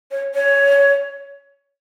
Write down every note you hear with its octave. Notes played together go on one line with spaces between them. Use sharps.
C#5
C#5